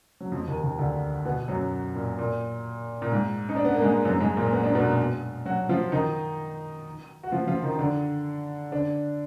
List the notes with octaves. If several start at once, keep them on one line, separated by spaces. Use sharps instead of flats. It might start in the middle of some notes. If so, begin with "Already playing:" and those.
F#3
F2 F3
D#2 D#3
D#2 D#3
D2 D3
B2 B3
F#2 F#3
A#2
A#2
A#2
G#2
D#4
D4
B3
A#3
G#2 G#3
F#2 F#3
G#2 G#3
A#2 A#3
B3
D4
B2 B3
F#3 F#4
F3 F4
D#3 D#4
F#4
F3 F4
F3 F4
D#3 D#4
D#4
D3 D4
D3 D4